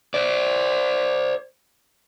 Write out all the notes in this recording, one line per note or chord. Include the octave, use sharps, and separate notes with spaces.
C5 D5